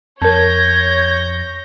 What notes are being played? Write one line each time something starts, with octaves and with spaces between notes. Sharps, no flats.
F2 A#4 C#5 A5 G6 G#6 A#6